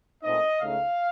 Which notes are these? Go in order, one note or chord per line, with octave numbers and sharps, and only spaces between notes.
A#2 A3 C4 D#4 D#5
C#2 C#3 A3 D#4 F5